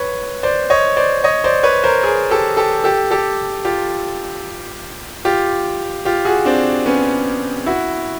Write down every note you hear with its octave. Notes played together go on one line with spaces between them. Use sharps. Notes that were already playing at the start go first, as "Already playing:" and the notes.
Already playing: B4 C#5
C5 D5
C#5 D#5
C5 D5
C#5 D#5
C5 D5
B4 C#5
A#4 C5
G#4 A#4
G4 A4
G4 A4
G4 A4
G4 A4
F4 G4
F4 G4
F4 G4
F#4 G#4
C4 D4
B3 C#4
E4 F#4